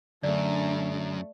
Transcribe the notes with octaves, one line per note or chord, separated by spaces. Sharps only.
F#2 D3 F#3 A3 D4 D5